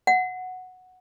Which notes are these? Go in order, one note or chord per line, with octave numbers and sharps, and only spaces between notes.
F#5